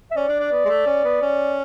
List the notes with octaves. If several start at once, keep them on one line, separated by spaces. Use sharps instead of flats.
E5
C#4 D5
D4
D4
B3
G#3
A3
C#4
B3
C#4